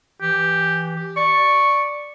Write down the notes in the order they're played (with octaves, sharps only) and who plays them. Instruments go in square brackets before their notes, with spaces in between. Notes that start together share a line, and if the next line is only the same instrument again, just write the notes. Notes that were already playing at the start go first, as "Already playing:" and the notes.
[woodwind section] E3 [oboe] G4
[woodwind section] G4
[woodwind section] D5 [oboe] C#6